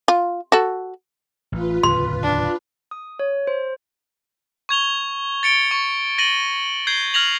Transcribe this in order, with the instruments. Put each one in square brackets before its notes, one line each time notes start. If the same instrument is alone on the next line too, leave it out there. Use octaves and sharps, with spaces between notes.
[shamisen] F4
F#4 A4
[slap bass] A1 [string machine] F4 B4
[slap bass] D1 E2 C#3 [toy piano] C6
[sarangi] D4
[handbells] D#6
C#5
C5
[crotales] C#6 G#6 F7 G7
A6 C#7 D7 G7
C#6
A6 A#6 D#7 F#7 G7
G6 G#6 C7 G7
F6 G#6 A#6 F7 F#7